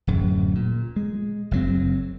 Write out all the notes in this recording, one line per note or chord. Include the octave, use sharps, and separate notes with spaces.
D1 F#2
A#2
G#3
F#1 F#3 C4